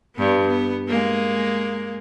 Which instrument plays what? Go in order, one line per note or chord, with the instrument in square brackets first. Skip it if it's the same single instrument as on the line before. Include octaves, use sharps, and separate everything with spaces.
[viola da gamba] G2 B3
B3
G#3 A#3